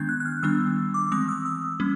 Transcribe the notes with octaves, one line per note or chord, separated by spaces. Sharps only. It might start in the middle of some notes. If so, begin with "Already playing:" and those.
Already playing: D#3 G#3 B3 D4 G6 G#6
F#6
F#6
F6
D#3 G3 B3 D4 E6
D6
E3 G#3 C4 D#6
E6
D#6
G3 A#3 C#4